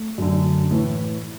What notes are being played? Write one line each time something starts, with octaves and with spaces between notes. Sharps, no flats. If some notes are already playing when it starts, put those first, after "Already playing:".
Already playing: A3
F#2 D3
A2 E3